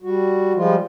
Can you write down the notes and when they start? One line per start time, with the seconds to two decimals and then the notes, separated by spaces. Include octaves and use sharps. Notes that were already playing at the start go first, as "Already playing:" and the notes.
0.03 G3 F#4
0.55 F3 G3 G#3 F4